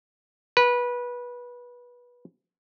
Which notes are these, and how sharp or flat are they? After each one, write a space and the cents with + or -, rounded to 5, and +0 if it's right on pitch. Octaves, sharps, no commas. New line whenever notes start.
B4 -20